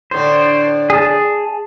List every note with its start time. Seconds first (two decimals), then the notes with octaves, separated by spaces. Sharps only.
0.11 A2 D3 D4 C5
0.90 G#4 A5